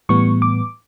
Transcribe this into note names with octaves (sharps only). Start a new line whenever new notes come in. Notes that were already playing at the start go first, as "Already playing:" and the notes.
A2 E3 G3 B3 C#6
D6